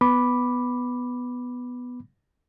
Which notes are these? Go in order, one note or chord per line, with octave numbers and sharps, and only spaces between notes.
B3 B5 D6